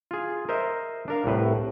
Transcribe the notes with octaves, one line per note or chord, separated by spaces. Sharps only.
F4 G#4
A#4 C5 D#5 E5
D4 A#4 F5
C2 A2 B4